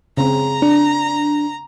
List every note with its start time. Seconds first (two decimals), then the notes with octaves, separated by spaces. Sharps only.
0.17 C#3 C4 A#5
0.62 D4